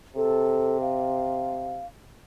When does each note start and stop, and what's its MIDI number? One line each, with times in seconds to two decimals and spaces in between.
0.17 1.85 48
0.17 0.77 69
0.81 1.86 77